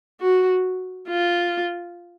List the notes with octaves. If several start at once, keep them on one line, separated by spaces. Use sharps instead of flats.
F#4
F4